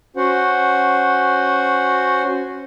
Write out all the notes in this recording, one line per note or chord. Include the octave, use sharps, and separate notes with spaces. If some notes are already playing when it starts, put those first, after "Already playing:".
C#4 F#4 C5 F#5